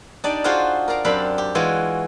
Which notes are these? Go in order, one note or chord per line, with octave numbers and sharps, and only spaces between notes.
D4 D#4 G4 D5
F4 F#4 G#4 C5 F5 F#5
A#4 D5 F5 A#5
F#2 C4 D4 G4 F5 B5
G4
E3 G#3 F4 F#4 C#5